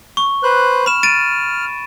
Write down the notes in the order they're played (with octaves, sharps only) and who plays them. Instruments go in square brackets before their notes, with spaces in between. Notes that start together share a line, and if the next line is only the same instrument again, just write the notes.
[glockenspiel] C#6
[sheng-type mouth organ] B4 C5 F#6
[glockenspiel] B5 E7 [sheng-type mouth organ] F6
[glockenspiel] A6 D7 D#7